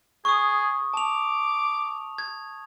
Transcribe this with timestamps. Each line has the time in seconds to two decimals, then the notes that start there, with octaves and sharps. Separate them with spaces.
0.25 G#4 C#6 D#6
0.94 A5 D6 F7
2.18 G#6